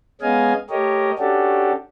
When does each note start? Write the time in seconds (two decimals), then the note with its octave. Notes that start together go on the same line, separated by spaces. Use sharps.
0.21 G#3 B3 C#4 D#5 F5 G#5
0.70 A3 G4 A#4 C#5 D#5
1.19 C#4 D4 F#4 G4 A4